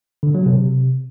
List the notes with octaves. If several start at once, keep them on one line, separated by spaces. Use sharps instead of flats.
D3
F#3
C3